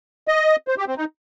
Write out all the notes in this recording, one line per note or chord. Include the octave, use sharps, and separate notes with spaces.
D#5
C5
G4
C4
D#4